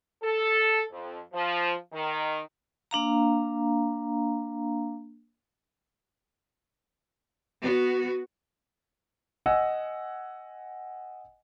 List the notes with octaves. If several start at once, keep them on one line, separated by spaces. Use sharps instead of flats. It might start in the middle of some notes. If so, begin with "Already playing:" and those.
A4
F2
F3
D#3
A#3 D4 F5 A#5
B3 F#4
D#5 F#5 G#5 E6